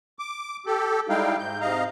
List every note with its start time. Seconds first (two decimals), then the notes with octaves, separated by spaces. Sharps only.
0.19 D6
0.66 G4 A4
1.09 G3 G#3 D#4 E4 F5 G5
1.39 G#2 G6
1.60 G#2 C3 D#5 F5 A#5